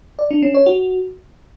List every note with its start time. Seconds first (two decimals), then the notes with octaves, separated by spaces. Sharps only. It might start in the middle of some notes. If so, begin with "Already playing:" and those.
0.19 D5
0.31 D4
0.42 C#4
0.54 C#5
0.66 F#4